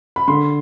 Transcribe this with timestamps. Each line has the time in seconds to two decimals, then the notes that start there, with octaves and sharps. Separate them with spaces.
0.16 B5
0.28 D3 C6